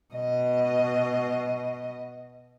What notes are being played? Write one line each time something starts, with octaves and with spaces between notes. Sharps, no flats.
B2 D#5